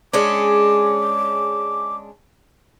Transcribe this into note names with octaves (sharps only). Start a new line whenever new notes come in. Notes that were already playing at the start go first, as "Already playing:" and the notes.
G#3 C#4 D4 D6